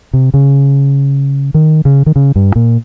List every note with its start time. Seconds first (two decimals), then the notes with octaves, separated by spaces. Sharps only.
0.13 C3
0.34 C#3
1.54 D#3
1.85 C#3
2.06 D#3
2.16 C#3
2.36 G2
2.56 A#2